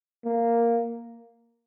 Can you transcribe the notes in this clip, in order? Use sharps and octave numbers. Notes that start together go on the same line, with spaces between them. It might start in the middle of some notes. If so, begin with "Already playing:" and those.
A#3